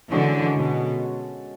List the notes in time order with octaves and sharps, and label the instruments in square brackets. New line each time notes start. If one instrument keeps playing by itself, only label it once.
[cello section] D3 E3 [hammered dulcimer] G#3 C#4 F#4 A4
[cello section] B2